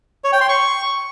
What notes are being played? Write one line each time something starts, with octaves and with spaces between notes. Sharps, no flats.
C#5
G5
C6
C#6